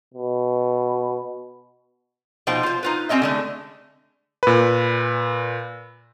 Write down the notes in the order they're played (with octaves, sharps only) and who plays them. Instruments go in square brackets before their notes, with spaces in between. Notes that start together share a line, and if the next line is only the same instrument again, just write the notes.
[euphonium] B2
[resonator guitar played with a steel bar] B2 F3 D#4 C5 G5
F4 C5
D#4 F4 B4
G3 C4 C#4 D#5 E5
D3 G#3 A3
[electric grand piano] A#2 B4